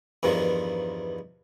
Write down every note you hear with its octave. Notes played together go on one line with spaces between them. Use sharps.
E2 G2 D#3 F3